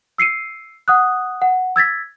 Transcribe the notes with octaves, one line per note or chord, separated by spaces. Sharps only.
E6 C7 C#7 D#7
F#5 D#6 F#6
F#5
E6 G#6 A6 B6